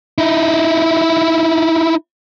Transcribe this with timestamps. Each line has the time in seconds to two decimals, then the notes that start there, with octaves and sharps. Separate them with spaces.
0.18 D#4 E4